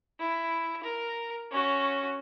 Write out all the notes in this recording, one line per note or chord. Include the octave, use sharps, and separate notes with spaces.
E4
A#4
C#4 F#4